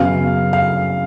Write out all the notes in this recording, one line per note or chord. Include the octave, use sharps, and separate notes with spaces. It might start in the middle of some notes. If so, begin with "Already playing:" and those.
Already playing: F#2 C#3 F#3 B3 F5
F5